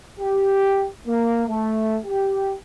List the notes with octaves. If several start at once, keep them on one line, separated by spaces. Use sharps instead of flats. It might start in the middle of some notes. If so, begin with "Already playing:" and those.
G4
A#3
A3
G4